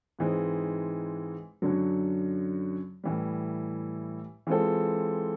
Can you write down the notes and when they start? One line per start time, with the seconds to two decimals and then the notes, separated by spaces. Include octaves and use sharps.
0.19 G#2 E3 G#3 C4 D#4
1.62 F#2 D3 F#3
3.04 A2 E3 G3
4.47 E3 G#3 C4 F4 A4